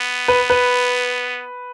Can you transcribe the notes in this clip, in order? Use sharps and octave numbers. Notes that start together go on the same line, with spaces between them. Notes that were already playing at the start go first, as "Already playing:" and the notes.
Already playing: B3
B4
B4